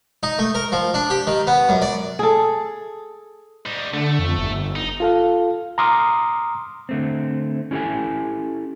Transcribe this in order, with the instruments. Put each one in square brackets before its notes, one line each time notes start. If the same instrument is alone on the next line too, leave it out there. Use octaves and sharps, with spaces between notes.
[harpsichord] D#4
A3
A#4
F3
D4
G4
D#3
B3
F#2
D5
[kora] G#4 A4
[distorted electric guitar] G3 D#4
[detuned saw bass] D3 [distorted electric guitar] A3
[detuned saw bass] F2
G1
[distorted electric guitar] D#4
[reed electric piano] F4 A4 F5
A#5 C6 D6 D#6 F6
[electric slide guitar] D3 A3 C4
C#4 E4 G4 A4 G#5